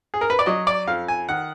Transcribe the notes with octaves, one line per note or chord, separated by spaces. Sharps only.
G#4
A#4
B4
D5
F#3 D#5
D5
F2 F5
G#5
D#3 F#5